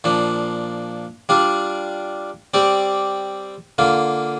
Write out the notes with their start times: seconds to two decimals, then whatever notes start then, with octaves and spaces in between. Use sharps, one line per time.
0.04 A#2 F3 D4
1.29 G3 D4 F4
2.54 G3 C4 G4 D5
3.78 D3 A#3 F4